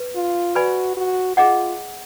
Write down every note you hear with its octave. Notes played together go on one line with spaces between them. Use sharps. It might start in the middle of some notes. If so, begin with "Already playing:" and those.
Already playing: B4
F4
F#4 B4 D5 G#5 B5
F#4
F4 G#4 D#5 F#5